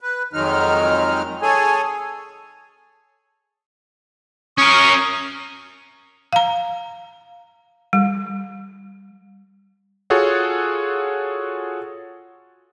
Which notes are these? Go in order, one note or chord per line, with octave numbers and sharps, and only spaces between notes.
B4
F2 D#3 F#3 G#3 D#4 F6
G#4 A4 C#5 G#5
C#4 A#4 C#6 D#6
F5 A#5
G3
F4 F#4 G#4 A4 C#5 F#5